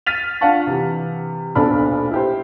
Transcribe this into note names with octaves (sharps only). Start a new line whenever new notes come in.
F6 A6 B6 D#7 F7
D4 F4 F5 F#5 A5 C#6
C3 E3
D#1 B1 D4 A4 B5 F6
E4 G4 C5